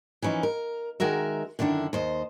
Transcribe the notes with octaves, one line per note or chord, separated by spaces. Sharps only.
E3 F3 C#4 D#4
A#4
D#3 G#3 F#4 A#4 E5
F#2 D3 D#3 D4 E4
D#2 C5 D#5